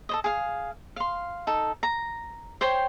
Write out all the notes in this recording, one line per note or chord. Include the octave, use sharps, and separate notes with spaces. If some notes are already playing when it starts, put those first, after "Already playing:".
A4 C5 D#5
G#4 F5
F5 C6
D#4 A4
A#5
C5 C#5 G5 C6